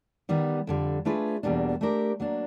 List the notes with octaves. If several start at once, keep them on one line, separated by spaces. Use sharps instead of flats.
D#3 G3 B3
F2 D3 G3
A3 D4 F4 G#4 B4
E2 B2 G3 A#3 D4
A3 D4 G4 A#4
F#3 A#3 D4